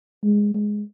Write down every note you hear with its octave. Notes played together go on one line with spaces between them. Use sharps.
G#3
G#3